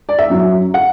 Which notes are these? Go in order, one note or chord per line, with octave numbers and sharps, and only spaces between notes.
D5
E5
F#2 F#3
F#5